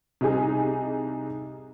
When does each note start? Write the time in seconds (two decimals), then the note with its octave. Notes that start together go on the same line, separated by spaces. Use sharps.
0.21 C2 G3 D#4 G#4